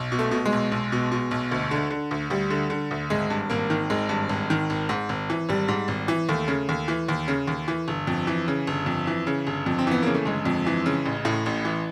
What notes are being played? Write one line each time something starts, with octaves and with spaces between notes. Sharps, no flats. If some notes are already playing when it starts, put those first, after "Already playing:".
Already playing: B1
B2
A3
B2
G#3
B1
B1
B2
B2
B1
D2
D3
D3
D2
D2 G3
D3
D3
D2
G#1 G#3
G2
G#1 A#3
D#3
G#1 G#3
G2
G#1
D#3
G#1
G#2
G#1
E3
G#1 G3
G#2
G#1
E3
D#2 A3
C#3
D#2
E3
D#2
C#3
D#2
E3
G1
F2
E3
C#3
G1
F2
E3
C#3
G1
F2
C4
E3 B3
C#3 A#3
A3
G1 G#3
F2
E3
C#3
A1
A2
A1
E3